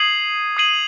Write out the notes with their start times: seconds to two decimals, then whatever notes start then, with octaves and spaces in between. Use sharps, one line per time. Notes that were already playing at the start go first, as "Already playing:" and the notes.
Already playing: D#6 G#6 C7 D#7 F#7
0.57 D#6 G#6 C7 D#7 F#7